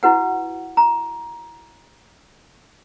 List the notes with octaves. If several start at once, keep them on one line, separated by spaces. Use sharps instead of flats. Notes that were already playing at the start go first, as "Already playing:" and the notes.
E4 F#4 B4 F#5
A#5